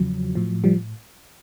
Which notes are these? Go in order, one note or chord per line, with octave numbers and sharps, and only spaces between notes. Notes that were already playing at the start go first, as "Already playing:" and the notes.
Already playing: E2 C#3 F3 F#3
A2 F3
F3 G3